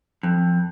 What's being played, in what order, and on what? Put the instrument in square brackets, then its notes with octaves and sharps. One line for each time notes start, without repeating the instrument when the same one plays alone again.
[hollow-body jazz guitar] F2